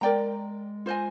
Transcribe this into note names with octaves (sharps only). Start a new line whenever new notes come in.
G#3 A#4 D5 G5 A#5
F4 C5 D#5 G#5